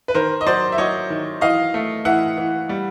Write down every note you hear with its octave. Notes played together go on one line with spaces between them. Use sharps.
B4
D#3 A#4 C5
D#5
F#3 C5 D5
E5
F#3 C#5 D#5
D#3
E3 D#5 F5
A3
E3 E5 F#5
E3
G3